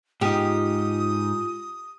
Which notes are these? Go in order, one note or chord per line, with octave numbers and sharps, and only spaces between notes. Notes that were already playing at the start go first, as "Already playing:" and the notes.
G#2 D#4 F4 G4 D#6